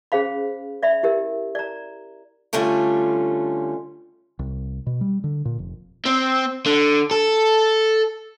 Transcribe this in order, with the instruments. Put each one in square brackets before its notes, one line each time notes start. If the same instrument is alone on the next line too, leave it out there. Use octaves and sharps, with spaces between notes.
[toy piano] C#4 G#4 C5 F5 B5
D5 E5 B5
E4 G4 A#4
D5 A#5
[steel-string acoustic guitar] D3 G3 A3 C#4 F4
[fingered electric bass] C2
B2
G3
D3
A#2
F1
[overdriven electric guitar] C4
D3
A4